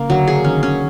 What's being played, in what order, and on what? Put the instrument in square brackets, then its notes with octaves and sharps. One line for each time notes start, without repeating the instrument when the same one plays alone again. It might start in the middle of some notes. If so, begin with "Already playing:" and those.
Already playing: [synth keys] C#3 [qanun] A#3
[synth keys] D3 [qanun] F#3
[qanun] G#4
[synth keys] D#3 [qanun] C#4
[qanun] C#4